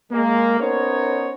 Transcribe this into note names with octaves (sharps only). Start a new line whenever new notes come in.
G#3 A#3
B3 C#4 D#4 A#4 C5 C#5